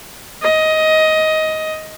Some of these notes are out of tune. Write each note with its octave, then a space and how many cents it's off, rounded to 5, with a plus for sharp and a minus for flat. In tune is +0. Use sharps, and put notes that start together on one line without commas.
D#5 +15